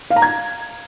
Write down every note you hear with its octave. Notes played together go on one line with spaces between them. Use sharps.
F5
A#5
G#6